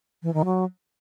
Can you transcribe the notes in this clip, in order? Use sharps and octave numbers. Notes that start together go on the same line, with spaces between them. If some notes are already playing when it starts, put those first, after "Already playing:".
E3
D#3
F#3